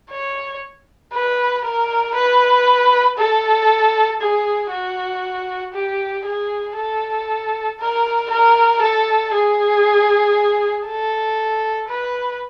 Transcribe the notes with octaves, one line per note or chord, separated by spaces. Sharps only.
C#5
B4
A#4
B4
A4
G#4
F#4
G4
G#4
A4
A#4
A#4
A4
G#4
A4
B4